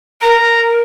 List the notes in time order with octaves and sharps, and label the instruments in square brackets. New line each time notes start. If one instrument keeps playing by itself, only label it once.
[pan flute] A#4 [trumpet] A#5